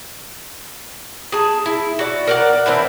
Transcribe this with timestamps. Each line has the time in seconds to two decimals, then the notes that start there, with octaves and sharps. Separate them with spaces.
1.32 G#4 A5
1.66 E4
1.99 F#4 D5
2.27 A#4 D5 F#5
2.66 E3 C4 D4 E4